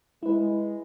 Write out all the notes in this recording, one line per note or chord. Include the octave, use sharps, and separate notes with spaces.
G#3 E4 B4